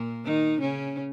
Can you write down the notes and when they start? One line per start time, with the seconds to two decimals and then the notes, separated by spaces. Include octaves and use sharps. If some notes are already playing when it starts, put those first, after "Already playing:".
Already playing: A#2 A#3
0.25 D#3 D#4
0.61 C#3 C#4